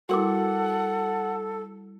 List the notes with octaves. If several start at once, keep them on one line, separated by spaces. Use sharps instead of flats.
G3 E4 F#4 A4 A#4 F#5 D6